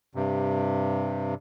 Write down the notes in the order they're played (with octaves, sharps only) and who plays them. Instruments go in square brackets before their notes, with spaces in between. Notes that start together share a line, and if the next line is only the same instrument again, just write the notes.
[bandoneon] G2 C3